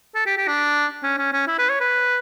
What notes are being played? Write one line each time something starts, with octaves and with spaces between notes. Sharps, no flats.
A4
G4
G4
D4
C#4
C#4
C#4
E4
B4
C#5
B4